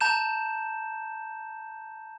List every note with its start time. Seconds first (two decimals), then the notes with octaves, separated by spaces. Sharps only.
0.01 A5 A#5 G6 E7